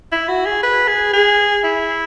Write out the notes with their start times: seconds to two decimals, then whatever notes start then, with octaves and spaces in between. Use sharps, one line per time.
0.12 E4
0.29 F#4
0.46 G#4
0.63 B4
0.88 G#4
1.13 G#4
1.64 E4